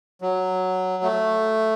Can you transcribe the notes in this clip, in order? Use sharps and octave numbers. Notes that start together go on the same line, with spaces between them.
F#3
A3